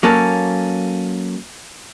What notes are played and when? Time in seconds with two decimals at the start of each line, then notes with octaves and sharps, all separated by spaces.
0.03 F#3 A#3 C#4 A4